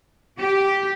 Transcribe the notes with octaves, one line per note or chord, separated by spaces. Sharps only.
G4